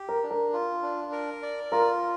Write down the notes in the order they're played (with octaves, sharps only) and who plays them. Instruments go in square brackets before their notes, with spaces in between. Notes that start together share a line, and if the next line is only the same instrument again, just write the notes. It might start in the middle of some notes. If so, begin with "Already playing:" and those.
Already playing: [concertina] G4
[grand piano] A#4
[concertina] D4
[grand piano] A#4
[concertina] F4
D4
A#4
D5
[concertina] F4 [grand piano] A#4